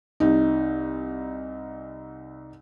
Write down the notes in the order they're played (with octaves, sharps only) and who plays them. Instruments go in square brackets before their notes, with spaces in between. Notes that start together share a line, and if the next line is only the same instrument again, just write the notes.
[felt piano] C2 D#4